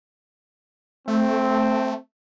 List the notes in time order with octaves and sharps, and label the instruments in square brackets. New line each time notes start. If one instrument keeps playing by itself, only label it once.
[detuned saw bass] A3 [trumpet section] C4